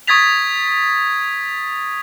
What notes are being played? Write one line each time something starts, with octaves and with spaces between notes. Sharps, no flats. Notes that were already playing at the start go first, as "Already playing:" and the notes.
C#6 D#6 G#6 A6 B6 F7